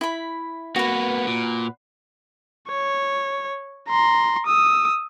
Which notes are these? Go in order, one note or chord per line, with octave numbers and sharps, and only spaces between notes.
E4 B5
A#3 B3 F#4 B4
A#2
C#5
A#5 C6
D#6 E6